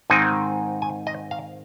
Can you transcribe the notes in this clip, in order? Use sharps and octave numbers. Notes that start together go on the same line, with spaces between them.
G#2 D#3 G#3 C4 D#4 G#5
G#5
D#5
F5